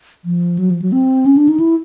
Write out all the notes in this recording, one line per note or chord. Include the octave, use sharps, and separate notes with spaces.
F3
F#3
F3
F#3
C4
C#4
D4
D#4
E4